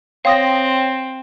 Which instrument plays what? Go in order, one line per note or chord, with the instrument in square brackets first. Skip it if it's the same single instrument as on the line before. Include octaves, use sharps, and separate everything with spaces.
[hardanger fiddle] C4 [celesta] C#5 G5 C6 [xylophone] F5 D#6 A#6